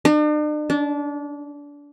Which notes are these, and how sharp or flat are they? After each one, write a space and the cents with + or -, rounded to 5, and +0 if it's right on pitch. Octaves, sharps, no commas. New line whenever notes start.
D4 +45
D4 -25